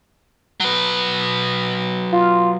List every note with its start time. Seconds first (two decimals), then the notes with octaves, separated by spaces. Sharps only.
0.60 F#3 B4
2.13 F4